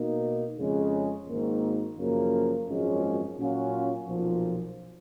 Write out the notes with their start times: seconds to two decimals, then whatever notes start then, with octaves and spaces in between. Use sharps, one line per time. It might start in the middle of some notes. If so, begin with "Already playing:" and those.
Already playing: B2 A#3 D#4
0.58 F2 C#3 G#3 C#4
1.28 G#1 G#2 D#3 A#3
1.98 F#2 C#3 F3 A#3 C#4
2.68 G#1 F#2 F3 G#3 C#4
3.37 A#2 F#3 C#4 F4
4.07 B1 A#2 F3